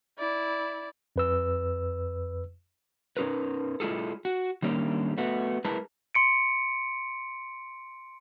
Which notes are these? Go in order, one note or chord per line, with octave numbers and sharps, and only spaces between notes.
E4 D5
F2 B4 E6
C#4 D#4 F4 A#4 B4
G#3 E4 F4 G#4 A4
F#4
D#3 G3 A#3 C#4 D4
A3 B3 F#4
G#3 E4 G#4 A#4 B4 A5
C6 C#7 D7